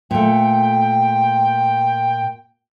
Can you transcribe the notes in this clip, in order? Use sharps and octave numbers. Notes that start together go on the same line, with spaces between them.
A#2 A3 G5